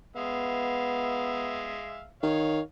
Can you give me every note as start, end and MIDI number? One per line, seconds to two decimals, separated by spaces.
0.16 2.08 56
0.16 1.81 59
0.16 2.08 76
0.16 2.08 77
2.23 2.61 51
2.23 2.59 73
2.23 2.59 77